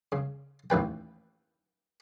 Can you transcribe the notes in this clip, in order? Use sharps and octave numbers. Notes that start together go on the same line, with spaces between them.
C#3
A1 D#2 B4 G5